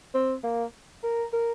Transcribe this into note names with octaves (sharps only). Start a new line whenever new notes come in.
C4
A#3
A#4
A#4